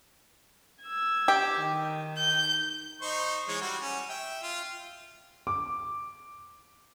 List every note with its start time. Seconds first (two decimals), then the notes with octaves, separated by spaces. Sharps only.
0.82 E6 G#6
1.28 G4
1.59 D#3
2.18 G6
3.02 D#4 C5 C#6
3.48 E3 G#3 C#5
3.61 G3 F#4
3.82 C#4
4.09 E5 G5
4.43 F4
5.47 D6